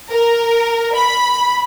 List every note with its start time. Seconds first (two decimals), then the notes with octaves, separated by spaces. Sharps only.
0.11 A#4
0.94 B5